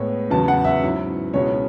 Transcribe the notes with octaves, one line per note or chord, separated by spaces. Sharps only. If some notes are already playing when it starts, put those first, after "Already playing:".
Already playing: A2 G#3 B3 C#5
E2 C#3 F#3 B3 A5
F#5
E5
G#2 F#3 C#4 E4
C#2 B2 G#3 C#4 E4 C#5